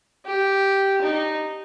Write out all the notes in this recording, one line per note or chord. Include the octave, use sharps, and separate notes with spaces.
G4
D#4